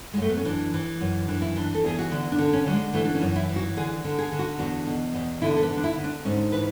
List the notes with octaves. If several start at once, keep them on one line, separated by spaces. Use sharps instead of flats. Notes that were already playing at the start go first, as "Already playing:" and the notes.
G#3
F#2 A3
B3
C#4
E3 D4
E3
F#2
E3 D4
E4
E3 D4
A4
E2 G#4
F#4
D3 E4
D4
D3
C#4
D3 F#3
G#3
E3 A3
D4
C#4
F#2
E4
E3
F#4
D3 G#4
D3
G#4
D3
F#4
E2 F#4
B2
E2
D3 E4
A4
B4
D3
D4
E4
D3
D4
G#2 C#4
E3 B4